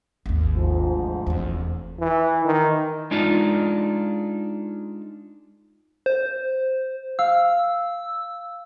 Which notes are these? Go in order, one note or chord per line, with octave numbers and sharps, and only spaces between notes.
G#1 D#2
D2 G#2 F3
F1 E2
E3
D#3
G#3 D4 D#4 F4
C5
F5 E6